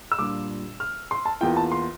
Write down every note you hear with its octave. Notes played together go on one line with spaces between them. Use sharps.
E6
A#2 G3 D4 F4 D6
F6
C6
A5
E2 E3 A#3 F4 G5
A5
C6